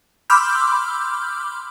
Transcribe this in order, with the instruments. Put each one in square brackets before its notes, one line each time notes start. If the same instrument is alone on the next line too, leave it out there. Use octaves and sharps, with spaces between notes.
[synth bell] B5 C6 D6 E6 F6 G6